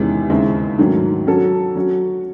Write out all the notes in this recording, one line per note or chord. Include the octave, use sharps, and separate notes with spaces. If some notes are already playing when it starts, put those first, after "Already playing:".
Already playing: E2 C3 D#3 G#3 C#4
D#2 C#3 G#3 C4 E4
G#2 D#3 F#3 A3 C#4
F#3 C#4 F#4 A4
F#3 C#4 F#4